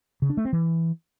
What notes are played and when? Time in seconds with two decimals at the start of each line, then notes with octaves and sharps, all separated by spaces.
0.22 C#3
0.30 D4
0.37 A3
0.45 C4
0.53 E3